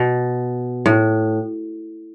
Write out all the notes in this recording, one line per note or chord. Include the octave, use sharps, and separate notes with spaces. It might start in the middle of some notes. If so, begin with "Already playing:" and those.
Already playing: B2
A2